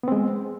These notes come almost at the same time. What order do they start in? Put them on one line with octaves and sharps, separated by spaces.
B3 C4 G#3